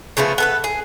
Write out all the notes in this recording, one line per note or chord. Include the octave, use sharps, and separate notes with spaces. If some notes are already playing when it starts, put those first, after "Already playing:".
C#3 F3 A3 B3
B3 A4 B4
G#4